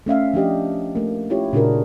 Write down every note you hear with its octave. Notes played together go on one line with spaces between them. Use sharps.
A3 C#4 E5 F5
F3 D4 G4 D#5
A3 A#3
C#4 E4 F4 G4 C#5
A#2 C#3 D4 F#4 G#4 A#4